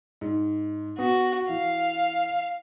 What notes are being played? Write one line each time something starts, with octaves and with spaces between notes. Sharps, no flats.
G#2
B3 F#4
E3 F5